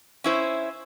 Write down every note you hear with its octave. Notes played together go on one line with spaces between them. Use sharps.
C#4 E4 C5